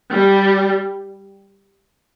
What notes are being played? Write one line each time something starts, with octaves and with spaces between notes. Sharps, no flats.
G3